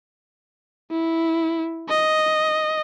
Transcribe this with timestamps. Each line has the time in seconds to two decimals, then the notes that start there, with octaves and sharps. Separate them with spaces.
0.91 E4
1.89 D#5